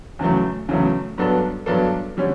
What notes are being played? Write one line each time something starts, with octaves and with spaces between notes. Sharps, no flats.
E2 C#3 F#3 A3
E2 C#3 F#3 A3
G2 F#3 B3 D4 A4
G2 F#3 B3 D4 A4
D3 G3 C#4